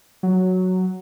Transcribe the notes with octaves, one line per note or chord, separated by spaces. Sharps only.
F#3